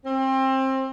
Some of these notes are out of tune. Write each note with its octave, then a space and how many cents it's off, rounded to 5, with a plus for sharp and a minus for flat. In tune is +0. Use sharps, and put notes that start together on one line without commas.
C4 +25